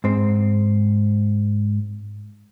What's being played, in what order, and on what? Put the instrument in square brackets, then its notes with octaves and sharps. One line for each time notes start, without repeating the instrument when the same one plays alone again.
[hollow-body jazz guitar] G#2 C4